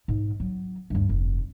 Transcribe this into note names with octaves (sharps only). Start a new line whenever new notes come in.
G#2
F#3
D2 G2
F1